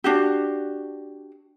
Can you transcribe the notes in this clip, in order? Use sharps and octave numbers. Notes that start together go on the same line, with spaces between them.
D4 F#4 G4